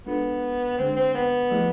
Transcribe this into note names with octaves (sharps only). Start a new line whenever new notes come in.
G#3 B3 D4 F4 A4
D3 G#3 C4 D4 G#4
C4
B3
F3 A3 E4 G#4